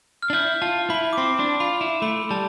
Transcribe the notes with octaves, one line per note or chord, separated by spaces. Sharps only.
F6
D4
E4 G6
F4 A5
E4 B5
D6
C4 C6
D4
F4 B5
E4
A3 B5
G3 A5